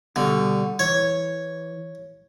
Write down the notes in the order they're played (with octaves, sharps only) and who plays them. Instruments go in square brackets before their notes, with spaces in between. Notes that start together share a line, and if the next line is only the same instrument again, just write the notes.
[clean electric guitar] B2 G3 [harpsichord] D3
[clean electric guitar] E3 [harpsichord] C#5